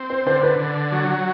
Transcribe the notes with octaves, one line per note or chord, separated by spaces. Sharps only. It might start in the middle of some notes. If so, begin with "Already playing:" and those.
Already playing: C4
C5
D3 C5
B4
D3
F#3